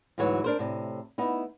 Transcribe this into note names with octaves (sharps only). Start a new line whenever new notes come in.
D2 G#2 E3 F#3 C#5
D4 A#4 C5
A2 C3
B3 D#4 E4